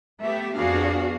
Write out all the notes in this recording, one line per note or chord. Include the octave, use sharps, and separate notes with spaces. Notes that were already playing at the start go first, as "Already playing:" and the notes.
A3 B3 G4 E5
F2 B3 D4 F#4 G#4 F5